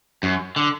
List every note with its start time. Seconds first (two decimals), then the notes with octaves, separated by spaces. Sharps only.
0.23 F#2
0.56 D3